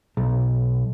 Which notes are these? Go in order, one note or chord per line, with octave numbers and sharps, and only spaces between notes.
B1